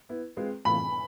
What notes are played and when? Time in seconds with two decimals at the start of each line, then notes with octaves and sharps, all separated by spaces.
0.09 B3 E4 B4
0.37 G#3 C4 F4 G#4 B4
0.65 A2 E3 A3 C4 F4 B5